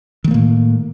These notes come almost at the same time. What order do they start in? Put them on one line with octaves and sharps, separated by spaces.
D#3 A3 A#3 A2